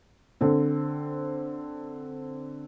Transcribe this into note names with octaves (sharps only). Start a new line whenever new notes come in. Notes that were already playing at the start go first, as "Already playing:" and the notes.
D3 C4